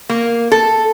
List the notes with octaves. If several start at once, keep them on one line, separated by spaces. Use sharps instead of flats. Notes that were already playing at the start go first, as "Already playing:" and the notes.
A#3
A4